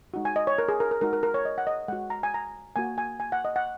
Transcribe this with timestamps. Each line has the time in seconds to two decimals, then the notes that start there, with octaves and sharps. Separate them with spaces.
0.14 G#3 D#4 F#4
0.25 G#5
0.36 D#5
0.47 C#5
0.58 A#4
0.68 G#4
0.80 A#4
0.91 A#4
1.01 G#3 D#4 F#4 A#4
1.13 A#4
1.23 A#4
1.34 C#5
1.45 D#5
1.58 F#5
1.67 D#5
1.88 G#3 F#4 F#5
2.10 A#5
2.23 G#5
2.34 A#5
2.76 A#3 F#4 G#5
2.98 G#5
3.20 G#5
3.32 F#5
3.45 D#5
3.56 F#5